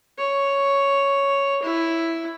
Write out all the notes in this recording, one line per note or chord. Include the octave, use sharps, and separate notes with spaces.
C#5
E4